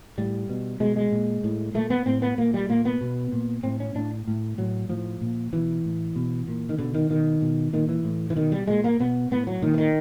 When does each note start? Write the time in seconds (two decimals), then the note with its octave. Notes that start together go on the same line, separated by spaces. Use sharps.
0.18 A2 G3
0.49 B2
0.80 B2 G#3
0.96 G#3
1.12 A#2
1.44 A2
1.74 A#2 A3
1.90 B3
2.06 A2 C4
2.22 B3
2.38 A#2 A#3
2.54 G3
2.69 A#2 A#3
2.85 B3
3.01 B2
3.32 A#2
3.63 A2 C4
3.80 C#4
3.95 A2 D4
4.27 A2
4.58 A2 F#3
4.89 A2 F3
5.22 A#2
5.53 B2 E3
5.85 A2
6.16 B2
6.48 A#2
6.69 D#3
6.78 B2 D3
6.94 D#3
7.10 B2 D#3
7.42 B2
7.73 A#2 D#3
7.89 E3
8.04 A2
8.30 E3
8.36 B2 D#3
8.52 G3
8.67 A#2 G#3
8.84 A#3
9.00 B2 B3
9.31 A2 B3
9.47 F#3
9.62 A#2 D#3
9.74 E3
9.78 D#3